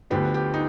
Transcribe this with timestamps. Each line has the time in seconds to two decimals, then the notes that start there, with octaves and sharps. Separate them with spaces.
0.10 D2 D3 F3 B3 D4 G4
0.34 G4
0.54 D#4